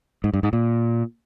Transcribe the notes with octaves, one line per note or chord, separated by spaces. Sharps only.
G#2
G2
G#2
A#2